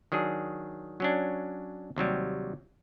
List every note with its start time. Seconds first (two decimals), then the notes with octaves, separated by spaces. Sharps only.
0.12 D#3 F#3 D4 G#4
1.00 F#3 C#4 D4
1.96 D#2 C3 F#3 G3